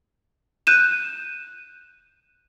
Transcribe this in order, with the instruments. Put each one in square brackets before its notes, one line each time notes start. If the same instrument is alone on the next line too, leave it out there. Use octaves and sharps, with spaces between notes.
[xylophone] F#6 G6 D#7 E7